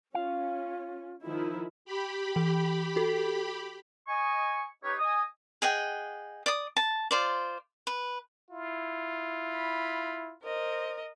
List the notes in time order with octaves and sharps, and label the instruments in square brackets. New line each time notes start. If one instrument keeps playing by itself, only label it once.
[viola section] C#4 [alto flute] F4 [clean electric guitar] F5
[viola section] D#3 F3 E4
[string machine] G4 B5
[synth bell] E3
F#4 A4
[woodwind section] D#5 G#5 C#6
D#4 G4 B4 C#5
D#5 G#5 D#6
[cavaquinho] G#4 D#5 F#5 G5
D5 D#6
A5
F4 C5 D5
B4
[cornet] E4 [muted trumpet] F4
[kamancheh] B5
[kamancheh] A#4 D#5 [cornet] C5